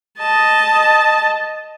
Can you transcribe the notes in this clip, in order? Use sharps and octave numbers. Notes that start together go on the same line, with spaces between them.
D#5 A5